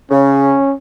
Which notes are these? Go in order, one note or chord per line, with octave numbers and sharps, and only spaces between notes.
C#3 C#4